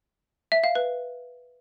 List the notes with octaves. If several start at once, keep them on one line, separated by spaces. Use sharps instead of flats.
E5
F5
B4